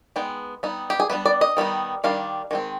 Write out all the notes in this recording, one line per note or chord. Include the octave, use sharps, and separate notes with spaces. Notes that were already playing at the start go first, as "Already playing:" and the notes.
G#3 B3 D#4 G5
G3 B3 D#4
G4
G#4
G3 B3 D4 B4
D5
D#5
D#3 G3 B3 D#4
D#3 G3 D4 F5
D#3 G#3 C4